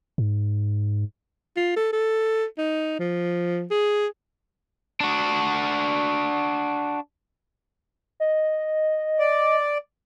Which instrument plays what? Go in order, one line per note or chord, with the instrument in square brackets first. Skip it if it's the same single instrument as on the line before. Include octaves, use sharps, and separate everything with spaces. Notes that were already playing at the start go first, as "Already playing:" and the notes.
[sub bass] G#2
[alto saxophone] F4
A4
A4
D#4
F3
G#4
[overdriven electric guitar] D4 F#4
[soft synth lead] D#5
[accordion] D5